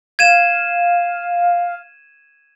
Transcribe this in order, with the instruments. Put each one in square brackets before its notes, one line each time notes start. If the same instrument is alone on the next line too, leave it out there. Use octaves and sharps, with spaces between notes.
[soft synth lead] F5 [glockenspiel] G#6 D#7 E7